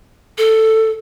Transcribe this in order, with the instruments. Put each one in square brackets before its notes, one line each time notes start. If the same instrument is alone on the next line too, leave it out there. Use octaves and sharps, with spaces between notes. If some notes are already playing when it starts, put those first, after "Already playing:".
[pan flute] A4